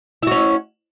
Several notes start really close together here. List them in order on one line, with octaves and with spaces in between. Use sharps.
E4 F#4 C#4